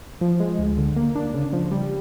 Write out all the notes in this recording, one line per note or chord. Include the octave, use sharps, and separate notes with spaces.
F3
G#3
D2
D3
A#3
D4
C#3
F3
G3